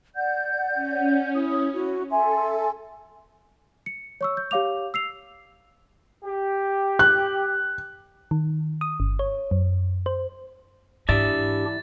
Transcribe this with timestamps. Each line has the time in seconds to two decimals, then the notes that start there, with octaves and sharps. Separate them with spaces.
0.16 D5 F#5 G6
0.73 C#4
1.34 E4 D#6
1.73 E4 F#4
2.10 A4 E5 G#5 C6
3.86 C#7
4.21 C#5 C#6 E6
4.37 G6
4.51 G4 C#5 F5 D6 F7
4.94 E6 C7 F7
6.24 G4
6.99 F#6
8.31 D#3
8.81 D#6
9.00 G1
9.19 C#5
9.51 F#2
10.06 C5
11.09 G#2 E3 D4 G4 D5 E5 A6